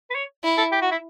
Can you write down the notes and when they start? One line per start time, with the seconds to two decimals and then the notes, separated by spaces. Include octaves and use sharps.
0.10 B4
0.15 C#5
0.43 E4
0.58 A4
0.72 G4
0.82 F#4
0.91 E4